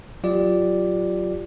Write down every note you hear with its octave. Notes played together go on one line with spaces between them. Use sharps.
F#3 F4 G4 D5